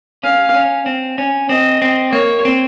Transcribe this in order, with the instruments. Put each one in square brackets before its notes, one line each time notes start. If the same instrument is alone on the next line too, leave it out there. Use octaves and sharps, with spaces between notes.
[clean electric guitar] C#4 [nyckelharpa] F5
[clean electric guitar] C#4
C4
C#4
[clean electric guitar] C4 [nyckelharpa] D#5
[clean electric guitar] C4
[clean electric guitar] A#3 [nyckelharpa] C#5
[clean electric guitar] C4